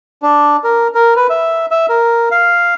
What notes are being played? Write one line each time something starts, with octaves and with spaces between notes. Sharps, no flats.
D4
A#4
A#4
B4
E5
E5
A#4
F5